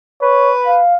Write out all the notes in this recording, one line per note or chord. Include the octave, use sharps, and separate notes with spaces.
B4 C#5
F5